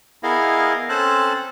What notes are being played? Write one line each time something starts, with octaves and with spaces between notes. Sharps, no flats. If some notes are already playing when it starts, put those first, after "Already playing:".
B3 E4 G#4 A#4 D#5 F5
C4 C#4 A4 C5 A5 F#6